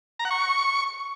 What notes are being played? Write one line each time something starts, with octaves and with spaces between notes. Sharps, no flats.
A#5
F#5
C#6